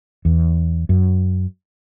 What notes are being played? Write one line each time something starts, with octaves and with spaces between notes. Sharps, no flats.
E2
F#2